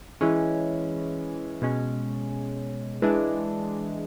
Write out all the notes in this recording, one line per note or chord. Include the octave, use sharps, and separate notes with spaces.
E3 G#3 C#4
B2 G#3 C#4
E3 G#3 D4